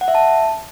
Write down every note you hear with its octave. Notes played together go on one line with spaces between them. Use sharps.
F#5
E5
A5